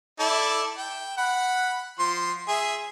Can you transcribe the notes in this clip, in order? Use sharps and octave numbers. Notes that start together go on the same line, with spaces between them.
E4 A4 D5
G5
F#5 B5
F3 C6
G#4 E5